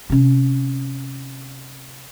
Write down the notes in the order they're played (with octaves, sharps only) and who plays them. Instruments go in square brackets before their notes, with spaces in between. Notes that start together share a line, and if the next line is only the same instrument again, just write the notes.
[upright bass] C3 C#4